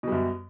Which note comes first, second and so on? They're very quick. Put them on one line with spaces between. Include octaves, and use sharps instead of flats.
B2 G3 F#2